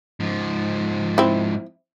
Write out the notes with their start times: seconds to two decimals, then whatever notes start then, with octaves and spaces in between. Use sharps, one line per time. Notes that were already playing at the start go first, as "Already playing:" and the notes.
0.20 G#2 F3
1.18 C4 E4